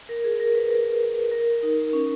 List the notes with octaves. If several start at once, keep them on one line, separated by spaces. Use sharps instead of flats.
A#4
G#4
A#4
B4
A#4
A#4
D#4
C#4